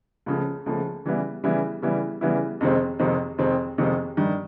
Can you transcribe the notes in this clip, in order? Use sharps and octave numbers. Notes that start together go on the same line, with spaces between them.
C#2 C#3 F3 A3
C#2 C#3 F3 A3
C#3 E3 G3 B3 E4
C#3 E3 G3 B3 E4
C#3 E3 G3 B3 E4
C#3 E3 G3 B3 E4
F2 C3 D#3 G#3 C4
F2 C3 D#3 G#3 C4
F2 C3 D#3 G#3 C4
F2 C3 D#3 G#3 C4
G2 D#3 G3